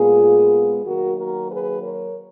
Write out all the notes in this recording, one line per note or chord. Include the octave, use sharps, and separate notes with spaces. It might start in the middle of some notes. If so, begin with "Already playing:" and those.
Already playing: A#2 G#3 B3 F4 G#4
D#3 F#3 A#3 F#4 A#4
F#4 A#4
G#4 B4
A#4 C#5